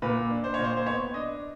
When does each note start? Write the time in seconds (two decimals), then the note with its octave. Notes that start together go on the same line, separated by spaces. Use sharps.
0.02 A#2 B4
0.30 D4
0.44 C5
0.54 A#2 C#5
0.64 C5
0.77 C5
0.86 B3 C#5
1.14 D4 D#5